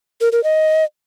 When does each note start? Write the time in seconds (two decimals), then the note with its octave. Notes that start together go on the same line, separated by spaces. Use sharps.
0.21 A#4
0.32 A#4
0.44 D#5